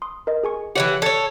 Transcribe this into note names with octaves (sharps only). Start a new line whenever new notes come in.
C6 D#6
A#4 D#5
G#4 G#5 C#6
E3 G3 G4 C#5 F#5
A4 C#5 D5 G#6